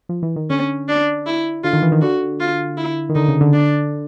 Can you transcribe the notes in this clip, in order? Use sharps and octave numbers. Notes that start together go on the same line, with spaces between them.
F3
E3
D#3
D3 C#4
D4
E4
D3 F4
D#3
E3
D#3
D3 F#4
F4
E4
D#3
D3 D#4
C#3
D3
D4